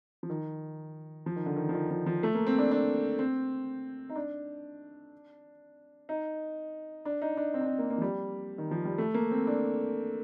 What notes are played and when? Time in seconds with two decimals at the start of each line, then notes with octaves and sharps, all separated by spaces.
0.23 F3
0.30 D#3
1.26 F3
1.36 D#3
1.46 D3
1.56 D#3
1.69 F3
1.74 D#3
1.91 F3
2.06 F3
2.23 A3
2.35 A#3
2.47 C4
2.58 D4
2.71 D4
3.19 C4
4.10 D#4
4.16 D4
6.09 D#4
7.05 D4
7.22 D#4
7.37 D4
7.54 C4
7.61 D4
7.66 C4
7.78 A#3
7.90 A#3
7.98 F3
8.02 G3
8.58 D#3
8.71 F3
8.85 G3
8.98 A3
9.14 A#3
9.31 C4
9.47 D4